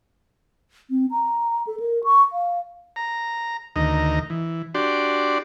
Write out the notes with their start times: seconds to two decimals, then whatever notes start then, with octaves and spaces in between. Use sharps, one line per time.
0.90 C4
1.11 A#5
1.67 A4
1.80 A#4
2.04 C#6
2.33 F5
2.96 A#5
3.76 D2 D#3 D#5 A#5
4.30 E3
4.75 D4 F#4 G4 D5 C6